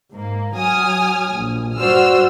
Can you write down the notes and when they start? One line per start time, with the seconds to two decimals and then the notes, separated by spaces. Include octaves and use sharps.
0.13 G#2 A#3
0.57 F#3 G#5 D#6 F6
1.34 A#1
1.77 G2 F#4 C5 D5 E6 F6